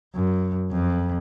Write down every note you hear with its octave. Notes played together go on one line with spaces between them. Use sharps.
F#2
F2